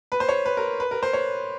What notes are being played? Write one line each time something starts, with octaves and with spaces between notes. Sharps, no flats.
B4
C5
C#5
B4
A#4
B4
A#4
C5
C#5